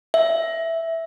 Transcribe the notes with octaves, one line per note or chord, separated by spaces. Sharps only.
E5